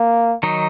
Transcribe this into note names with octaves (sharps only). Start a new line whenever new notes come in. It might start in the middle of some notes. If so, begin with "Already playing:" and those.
Already playing: A#3
D#3 F#3 D#4